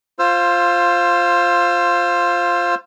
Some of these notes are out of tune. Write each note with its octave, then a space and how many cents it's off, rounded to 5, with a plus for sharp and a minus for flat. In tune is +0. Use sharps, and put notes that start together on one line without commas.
F4 +0 C5 +10 E6 +40